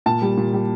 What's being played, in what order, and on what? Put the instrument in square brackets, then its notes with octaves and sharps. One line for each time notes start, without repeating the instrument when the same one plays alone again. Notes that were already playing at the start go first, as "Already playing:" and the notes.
[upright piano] A#2 A5
G3
A#2
G3